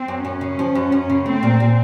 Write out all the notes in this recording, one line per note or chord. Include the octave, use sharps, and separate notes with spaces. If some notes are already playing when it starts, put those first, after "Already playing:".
Already playing: C4
F#2
F#2 C#4
C#3
F3
F#2
F#2
C#3
A3 C4
A#2
A#2